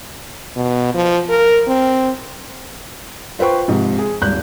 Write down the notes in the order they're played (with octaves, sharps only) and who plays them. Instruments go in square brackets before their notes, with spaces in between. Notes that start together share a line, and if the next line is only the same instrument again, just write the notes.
[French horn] B2
F3
A#4
C4
[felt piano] F4 B4 C5 G5 C#6
G#2 C3 F3
G#4
D#1 G#1 F#6 G6